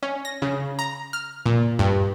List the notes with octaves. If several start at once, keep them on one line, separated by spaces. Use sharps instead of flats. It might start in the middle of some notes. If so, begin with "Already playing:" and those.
C#4
A#6
C#3
A#5
F6
A#2
G2